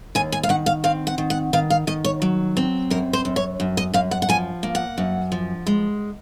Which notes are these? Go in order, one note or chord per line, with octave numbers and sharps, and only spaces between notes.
D#2 G#5
G#5
F5
D#3 F#5
F5
C4 F5
F#5
D#3
F#5
D#3 F5
F5
D#3 D#5
C#5
F#3
C4
F#2 A#4
C5
F#2
C#5
F#2
D#5
F#2 F5
F#5
F#5
F3 G#5
A#3
F#5
F#2
F3
G#3